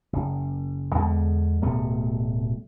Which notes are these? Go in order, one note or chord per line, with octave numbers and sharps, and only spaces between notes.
F#1
E2 D3 G#3
D1 B2 G3 A3